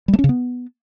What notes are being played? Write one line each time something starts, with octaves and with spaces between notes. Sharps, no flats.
G3
A3
C#4
C#3
B3